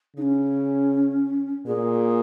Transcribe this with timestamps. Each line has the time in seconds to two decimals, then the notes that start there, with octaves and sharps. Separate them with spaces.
0.16 C#3 D#4
0.22 C#4
1.66 A#2 G#4